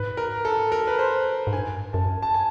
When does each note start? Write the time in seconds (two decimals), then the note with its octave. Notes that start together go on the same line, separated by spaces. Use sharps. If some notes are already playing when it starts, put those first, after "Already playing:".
Already playing: G#2 B4
0.17 A#4
0.45 A4
0.72 A#4
0.87 B4
0.99 C5
1.47 G#2
1.53 G2 G#5
1.93 F#2 A5
2.22 A5
2.34 G#5